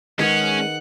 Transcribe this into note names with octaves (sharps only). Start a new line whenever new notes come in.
D#3 G#3 C#4 G#4 B4 F#5